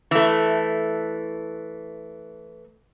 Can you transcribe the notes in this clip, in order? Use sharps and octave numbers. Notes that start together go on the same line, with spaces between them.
E3 A3